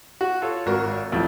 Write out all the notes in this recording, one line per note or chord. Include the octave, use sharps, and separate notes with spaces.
F#4
F4 A4 C#5
G#1 F#4 A#4
D#1 F2 E3 A3